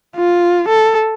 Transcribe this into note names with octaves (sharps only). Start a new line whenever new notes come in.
F4
A4